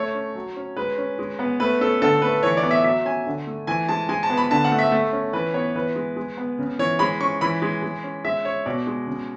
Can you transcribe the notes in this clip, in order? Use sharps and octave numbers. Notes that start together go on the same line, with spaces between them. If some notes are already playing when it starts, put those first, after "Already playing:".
Already playing: A3 C#5
C#4
F#3
C#4
G#3 B4
C#4
G#3
B3
A3 B4
C#4 A4
D3 A4
A3 B4
E3 C#5
D5
B3
E5
F#3 E5
C#4 G#5
D3
A3
E3 G#5
G#3 A5
G#3 G#5
A5
B3
B5
D3 A5
F#5
A3
E5
A3
C#4
E3 B4
B3 C#5
E3 B4
G#3
G#3
B3
C#3
E3 C#5
G#3 B5
C#4 C#6
E3 B5
G#3
G#3
C#4
G#3 E5
C#4 C#5
B2 D5
G#3
C#3